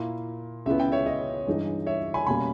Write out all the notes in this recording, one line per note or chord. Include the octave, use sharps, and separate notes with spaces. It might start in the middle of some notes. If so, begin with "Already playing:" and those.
Already playing: A#2 A#3 E4
C#2 C#3 G#3 B3 E4 E5
G5
C#5 E5
D#5
G2 E3 G#3 D#4
C#5 E5
G#5 B5
B2 G3 A#3 C#4 G#5 B5